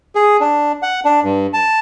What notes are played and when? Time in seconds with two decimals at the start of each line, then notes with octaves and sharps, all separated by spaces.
0.15 G#4
0.41 D4
0.82 F#5
1.05 D4
1.24 G2
1.53 A5